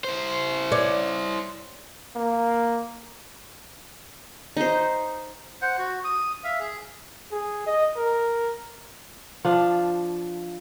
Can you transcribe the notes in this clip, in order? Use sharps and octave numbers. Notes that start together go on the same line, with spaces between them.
E4 C5
C#5 D5
A#3
D#4 C5
C5 F#5
F#4
D#6
E5 F5
G#4
G#4
D#5
A#4
F3 D4